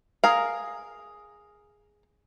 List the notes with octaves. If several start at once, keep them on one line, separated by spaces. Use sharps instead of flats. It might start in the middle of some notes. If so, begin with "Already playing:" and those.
G#4 A#4 F5